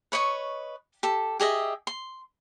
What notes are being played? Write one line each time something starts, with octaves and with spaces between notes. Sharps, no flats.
B4 C#5 D#5 C#6
G4 A4
G4 G#4 D#5 E5
C6